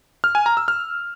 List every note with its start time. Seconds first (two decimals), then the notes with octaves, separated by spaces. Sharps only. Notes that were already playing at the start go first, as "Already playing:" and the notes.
0.24 F6
0.35 G#5
0.46 A#5
0.57 E6
0.68 F6